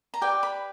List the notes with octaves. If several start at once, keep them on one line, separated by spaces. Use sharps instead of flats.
A#5
G4 B4 D5 G5
B5